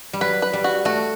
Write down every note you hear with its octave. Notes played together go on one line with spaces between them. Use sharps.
G3
F#3 B4
B4
G3
F#4
A3 F#4